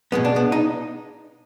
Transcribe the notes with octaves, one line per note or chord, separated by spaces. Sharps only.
B2 G#3 B3
D4
B3
D#4